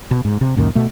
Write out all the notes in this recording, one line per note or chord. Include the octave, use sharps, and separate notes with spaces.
B2
G#2
C3
C#2 F#2 A#2 D#3
B2 A3